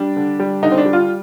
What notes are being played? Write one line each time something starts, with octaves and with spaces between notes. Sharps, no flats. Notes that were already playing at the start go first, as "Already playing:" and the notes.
Already playing: G3 D4
D3
G3
D3 D#4
C4
D4
G3
F4